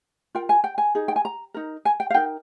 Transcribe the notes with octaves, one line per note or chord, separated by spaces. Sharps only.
F4 A#4 G5
G#5
G5
G#5
D#4 G#4
G5
G#5
A#5
D#4 A#4
G#5
G5
F5
D#4 A#4 G5